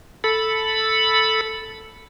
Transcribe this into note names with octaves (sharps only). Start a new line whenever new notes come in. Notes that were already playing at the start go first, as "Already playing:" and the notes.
A4 B5